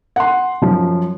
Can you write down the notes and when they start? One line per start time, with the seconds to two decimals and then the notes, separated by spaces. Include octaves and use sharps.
0.16 F#5 C6
0.62 F#2 F3